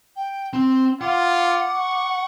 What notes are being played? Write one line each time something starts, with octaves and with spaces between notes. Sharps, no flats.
G5
C4 C6
F4 F#5 D6
C#6